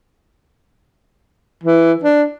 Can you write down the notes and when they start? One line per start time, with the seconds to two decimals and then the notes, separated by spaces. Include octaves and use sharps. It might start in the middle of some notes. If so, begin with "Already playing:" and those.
1.64 E3
2.04 D4